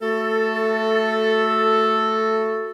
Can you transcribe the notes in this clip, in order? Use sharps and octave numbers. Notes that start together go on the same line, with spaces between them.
A3 F#4 A4